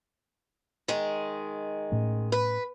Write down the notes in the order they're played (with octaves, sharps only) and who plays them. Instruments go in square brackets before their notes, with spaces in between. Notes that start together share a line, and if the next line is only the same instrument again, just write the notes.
[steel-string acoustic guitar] D#3 G#3
[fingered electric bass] A2 A3 C#4
[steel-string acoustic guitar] B4